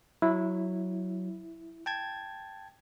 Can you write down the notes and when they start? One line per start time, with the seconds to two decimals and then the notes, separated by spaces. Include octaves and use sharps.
0.22 F#3 E4
1.86 G5 A5 G#6